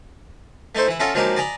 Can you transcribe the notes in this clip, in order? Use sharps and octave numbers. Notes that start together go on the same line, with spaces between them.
A3 D#4 A4 C5
E3 E4
C#4 F4 A4 D#5 E5 F#5
F3 F#3 G#3 A#3 D#4 G4
D5 D#5 G#5 A#5 B5